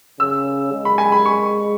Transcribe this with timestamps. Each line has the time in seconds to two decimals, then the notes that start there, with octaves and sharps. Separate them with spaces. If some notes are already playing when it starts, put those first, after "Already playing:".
0.20 C#3 E6
0.72 G#3
0.85 B5
0.98 G#5
1.12 B5
1.26 C#6